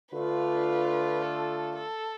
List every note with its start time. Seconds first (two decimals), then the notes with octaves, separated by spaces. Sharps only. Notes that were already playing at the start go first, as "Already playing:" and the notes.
0.13 D3 A3 D4 F4 B4
1.22 A4
1.76 A4